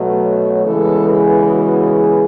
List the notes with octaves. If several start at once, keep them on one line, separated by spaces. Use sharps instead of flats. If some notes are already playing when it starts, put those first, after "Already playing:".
Already playing: B2 F#3 A3
C#5
C#3 E3 G#3 B3 A4
G#4
F#4
G#4